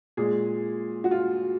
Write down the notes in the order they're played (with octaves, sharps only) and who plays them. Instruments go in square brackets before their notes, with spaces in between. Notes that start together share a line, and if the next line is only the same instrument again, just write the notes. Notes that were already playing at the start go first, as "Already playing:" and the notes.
[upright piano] A#2 G#3 G#4
F#4
F4